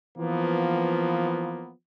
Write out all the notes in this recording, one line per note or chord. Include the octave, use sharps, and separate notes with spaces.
E3 F3 A#3 B3